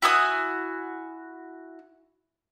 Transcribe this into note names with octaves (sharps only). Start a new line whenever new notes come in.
E4 F#4 G#5 D#6